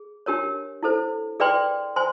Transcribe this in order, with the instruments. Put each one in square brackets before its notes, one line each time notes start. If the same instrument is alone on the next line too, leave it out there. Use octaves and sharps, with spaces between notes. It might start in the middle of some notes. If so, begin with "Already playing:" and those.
Already playing: [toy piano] G#4
D4 G4 A#4 C#5
E4 A4 C5
G#4 B4 D5 G5 C6
C5 G#5 C6